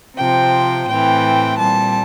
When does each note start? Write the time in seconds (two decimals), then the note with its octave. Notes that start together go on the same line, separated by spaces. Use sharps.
0.17 C3 F3 C4 G5
0.88 A2 E3 A3 C4 G5
1.59 A#2 G3 C4 A5